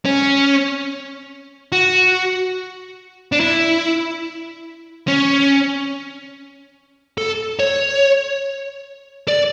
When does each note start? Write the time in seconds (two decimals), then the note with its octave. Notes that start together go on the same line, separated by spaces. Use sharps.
0.05 C#4
1.72 F#4
3.32 D4
3.40 E4
5.08 C#4
7.18 A4
7.59 C#5
9.28 D5